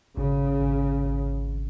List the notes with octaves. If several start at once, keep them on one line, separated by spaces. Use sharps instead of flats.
G#1 C#3
G#1
G#1